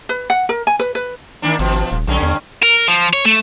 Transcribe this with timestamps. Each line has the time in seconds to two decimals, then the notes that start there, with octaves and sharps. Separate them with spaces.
0.09 B4
0.30 F#5
0.49 A#4
0.67 G#5
0.79 B4
0.95 B4
1.42 D#3 A#3 D4
1.59 G#1 B2 F3
1.91 D#1
2.07 B1 G2 D3 C#4
2.22 E2
2.63 A#4
2.88 F3
3.13 C#5
3.25 A3